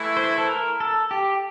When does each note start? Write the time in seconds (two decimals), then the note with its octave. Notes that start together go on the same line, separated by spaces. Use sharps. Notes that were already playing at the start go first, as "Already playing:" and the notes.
Already playing: E3 A3 E4
0.17 C5
0.38 A4
0.49 A#4
0.80 A4
1.11 G4